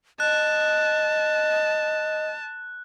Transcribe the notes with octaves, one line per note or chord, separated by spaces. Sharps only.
D#5 A5 F#6